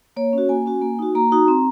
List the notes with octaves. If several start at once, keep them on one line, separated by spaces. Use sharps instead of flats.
A#3 C#5
C#4 F#4
A#3 G#5
C#4 F#4
A#3
D#4 F#4
A#3 A#5
D#4 F#4
C4